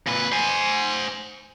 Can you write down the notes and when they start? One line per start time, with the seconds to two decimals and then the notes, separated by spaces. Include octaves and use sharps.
0.07 A#2 B4
0.32 C5 G#5